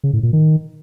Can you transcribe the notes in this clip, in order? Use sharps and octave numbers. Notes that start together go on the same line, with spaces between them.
C#3
A2
A#2
D#3